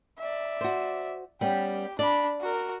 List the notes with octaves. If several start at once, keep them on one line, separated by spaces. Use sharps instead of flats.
D5 E5
F#4 C5
G3 B3 C#4 G4
D4 D5 B5
F#4 A#4